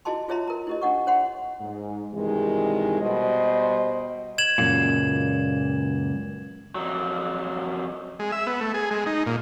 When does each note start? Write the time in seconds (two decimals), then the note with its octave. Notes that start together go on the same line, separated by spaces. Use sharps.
0.05 E4 F#4 G#4 D#5 A5 C6
0.28 F4 G#4 C#5 E5 A#5 C6
0.47 A#4 A#5
0.67 E4 G4 D#5
0.82 D4 D#5 F#5 C#6
1.07 C#5 F#5 C6
1.60 G#2
2.14 G2 C3 D#3 E3 G#3
3.01 B2 G3 C5 D#5
4.38 G#6 E7 F#7
4.58 C#2 F#2 A#2
6.75 F2 F#3
8.19 G#3
8.32 E5
8.47 B3
8.61 A3
8.74 G#4
8.91 G#3
9.06 D#4
9.27 A#2